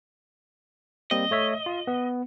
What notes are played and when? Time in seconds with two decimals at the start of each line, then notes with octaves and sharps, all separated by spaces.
1.11 G3 A#3 C4 D#5
1.31 A3 C#5 E5
1.66 F4
1.87 B3